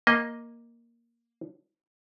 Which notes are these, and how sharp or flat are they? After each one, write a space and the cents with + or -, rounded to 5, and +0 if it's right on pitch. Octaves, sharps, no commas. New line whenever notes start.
A#3 +5 D#5 +0